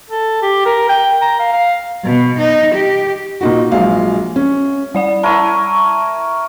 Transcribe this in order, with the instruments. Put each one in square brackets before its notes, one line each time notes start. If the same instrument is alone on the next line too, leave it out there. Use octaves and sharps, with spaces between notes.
[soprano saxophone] A4
G4
A#4
G5
A#5
F5
F5
[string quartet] B2
D#4
G4
[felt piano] A#2 D#4 F#4
A#1 F#3 G#3 F5
C#4
[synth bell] G3 D5 F#5
[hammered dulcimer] E4 A#4 C#5 [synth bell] A5 D#7